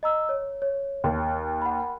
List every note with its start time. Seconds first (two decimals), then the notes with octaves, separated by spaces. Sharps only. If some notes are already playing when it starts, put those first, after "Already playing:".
0.03 D#5 A#5 E6
0.29 C#5
0.62 C#5
1.04 D#2
1.62 F#5 B5